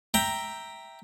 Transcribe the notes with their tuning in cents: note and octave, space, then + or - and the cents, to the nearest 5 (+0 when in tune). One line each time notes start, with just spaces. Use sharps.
E5 +0 G5 +0 A#5 +0